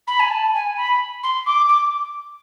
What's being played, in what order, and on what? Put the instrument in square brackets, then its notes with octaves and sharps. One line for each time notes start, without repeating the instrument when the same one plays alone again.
[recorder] B5
G#5
A5
G#5
B5
C6
D6
D6